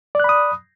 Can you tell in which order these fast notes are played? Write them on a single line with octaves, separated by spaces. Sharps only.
D5 F#6 B5 D#6